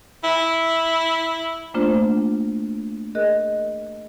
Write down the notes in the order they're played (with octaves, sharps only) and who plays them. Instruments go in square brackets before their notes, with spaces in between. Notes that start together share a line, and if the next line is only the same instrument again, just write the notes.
[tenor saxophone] E4
[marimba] A3 A#3 D4 F4 C5 D5
G#4 A#4 D#5 F#6